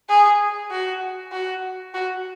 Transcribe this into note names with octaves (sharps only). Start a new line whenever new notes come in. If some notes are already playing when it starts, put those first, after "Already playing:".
G#4
F#4
F#4
F#4